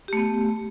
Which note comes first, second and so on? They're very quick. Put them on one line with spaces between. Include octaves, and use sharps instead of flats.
G4 A3 B3